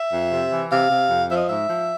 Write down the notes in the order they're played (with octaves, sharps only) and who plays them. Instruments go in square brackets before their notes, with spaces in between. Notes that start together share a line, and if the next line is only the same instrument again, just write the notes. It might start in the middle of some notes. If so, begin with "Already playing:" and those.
Already playing: [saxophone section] E5
F2
C3
E3
C3 F5
C3
F2
F3 E5
D#5
G#2 E5
F3